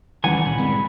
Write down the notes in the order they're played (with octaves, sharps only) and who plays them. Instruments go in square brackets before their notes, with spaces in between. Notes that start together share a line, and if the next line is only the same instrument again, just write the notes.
[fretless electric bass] E1 G3 C#4 [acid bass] E2 [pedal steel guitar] D#3 E3 F#5 [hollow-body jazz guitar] G#5
[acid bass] C#2 [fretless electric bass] A#2 [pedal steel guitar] B5
[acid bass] G2 [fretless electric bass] D3 G#3 C4